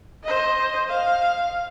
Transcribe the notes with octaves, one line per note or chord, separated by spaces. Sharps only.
C5 D#5
F5